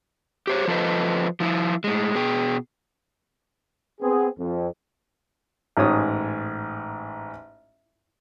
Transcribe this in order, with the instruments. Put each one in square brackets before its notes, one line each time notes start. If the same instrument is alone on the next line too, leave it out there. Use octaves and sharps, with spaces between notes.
[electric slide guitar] G4 C5 C#5
F3 F4 A4 B4 C5 D#5
F3 E4 F4
A2 G#3
B2 G#4 G5
[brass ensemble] B3 C4 G#4
F2
[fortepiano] A1 G#2 C#5 D#6